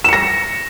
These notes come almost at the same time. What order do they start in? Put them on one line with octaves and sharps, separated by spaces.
E7 C#7 A#6